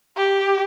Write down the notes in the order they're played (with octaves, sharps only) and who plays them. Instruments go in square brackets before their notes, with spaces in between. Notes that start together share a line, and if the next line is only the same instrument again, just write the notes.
[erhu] G4